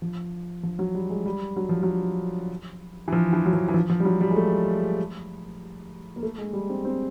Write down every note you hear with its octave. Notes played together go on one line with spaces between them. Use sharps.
F3
F3
F#3
G3
G#3
G3
F#3
F3
F#3
E3
F3
E3
F#3
F3
E3
F3
F3
G3
F#3
G3
G#3
A3
A#3
A3
G#3
G3
C4
C4